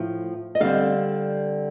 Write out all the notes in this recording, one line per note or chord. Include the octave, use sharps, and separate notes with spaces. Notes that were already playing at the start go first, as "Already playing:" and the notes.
Already playing: A2 F3
D#5
D3 G3 C4 F5